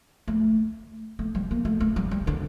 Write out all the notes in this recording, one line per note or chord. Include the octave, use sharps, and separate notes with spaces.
A3
A3
G3
A#3
A3
A3
G3
G3
D3